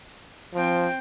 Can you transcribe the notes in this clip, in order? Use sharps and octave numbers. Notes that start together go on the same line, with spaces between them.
F3 C4 G5